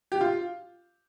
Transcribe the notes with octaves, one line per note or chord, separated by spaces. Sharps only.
G4
F4